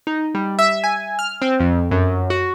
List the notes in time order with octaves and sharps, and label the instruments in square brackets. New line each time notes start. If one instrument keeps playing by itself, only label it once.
[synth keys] D#4
G3
E5
G#5
F6
C4
F2
F#2
F#4